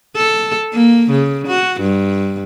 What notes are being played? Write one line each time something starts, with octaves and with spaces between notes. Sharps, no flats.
A4
A#3
C#3
F#4
G2